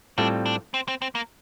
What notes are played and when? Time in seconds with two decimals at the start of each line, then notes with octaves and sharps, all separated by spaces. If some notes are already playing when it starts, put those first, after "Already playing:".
0.18 A2 G3 C4 D4 F4 A4
0.46 D4
0.74 C4
0.88 C4
1.02 C4
1.15 A#3